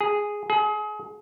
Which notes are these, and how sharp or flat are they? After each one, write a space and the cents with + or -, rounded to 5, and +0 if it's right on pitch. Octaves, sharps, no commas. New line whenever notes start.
G#4 -5
G#4 +30